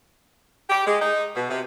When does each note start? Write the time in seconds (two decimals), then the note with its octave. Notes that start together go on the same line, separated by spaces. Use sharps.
0.70 G4
0.87 G#3
1.01 D#4
1.36 B2
1.49 C3